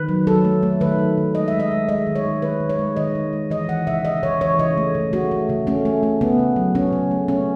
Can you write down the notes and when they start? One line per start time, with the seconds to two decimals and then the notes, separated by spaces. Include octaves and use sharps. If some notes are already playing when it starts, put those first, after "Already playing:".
Already playing: D#3 B4
0.09 F#3
0.27 F#3 A4
0.45 A3
0.63 A3
0.81 D#3 B4
0.98 F#3
1.18 D#3
1.35 G#3 D#5
1.48 G#3 E5
1.60 D#5
1.72 G#3
1.89 G#3 D#5
2.07 D#3
2.16 C#5
2.25 G#3
2.42 D#3 B4
2.60 D#3
2.70 C#5
2.79 G#3
2.97 D#3 D#5
3.15 G#3
3.33 G#3
3.51 E3 D#5
3.69 E3 F#5
3.87 C#3 E5
4.05 C#3 D#5
4.23 C#3 C#5
4.41 E3 C#5
4.59 C#3 D#5
4.77 A3
4.95 C#3
5.13 A3 F#4
5.31 A3
5.49 C#3
5.67 A3 C#4
5.85 A3
6.03 A3
6.21 C#3 B3
6.39 C#3
6.56 F#3
6.75 C#3 C#4
6.93 C#3
7.11 A3
7.28 C#3 C#4